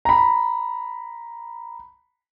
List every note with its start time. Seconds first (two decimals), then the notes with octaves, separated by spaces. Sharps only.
0.05 A#5 B5